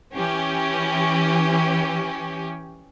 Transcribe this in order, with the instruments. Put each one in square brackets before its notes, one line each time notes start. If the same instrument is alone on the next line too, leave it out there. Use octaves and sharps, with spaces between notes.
[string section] E3 C#4 G4